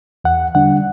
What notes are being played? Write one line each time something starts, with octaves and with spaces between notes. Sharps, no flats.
E2 F#5
D3 G3 D4 F#5